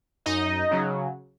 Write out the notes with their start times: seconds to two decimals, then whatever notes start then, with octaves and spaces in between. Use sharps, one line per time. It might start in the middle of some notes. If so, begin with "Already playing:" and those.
0.26 F#2 D#4 D#5
0.71 C#3 F#3